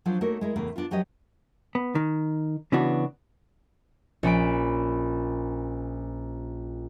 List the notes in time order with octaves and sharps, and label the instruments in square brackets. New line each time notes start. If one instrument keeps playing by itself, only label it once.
[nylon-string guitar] F3 F#3 D4 F4 F#4 C5
A3 A#3 D#4 F#4 A#4 C#5
G#3 E4 A#4
E2 A2 C#3 A#3
B3 D4 D#4 F4
F3 F#3 F#4 G4 C#5 D#5
[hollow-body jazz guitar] B3
D#3
C#3 E3 B3 D4 F#4
[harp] A#1 C#4 B5 D7